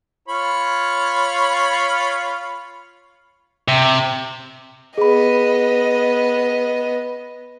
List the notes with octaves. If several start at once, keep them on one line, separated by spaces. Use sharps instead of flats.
F4 C#5 B5
C3
B3 G#4 D#5 B5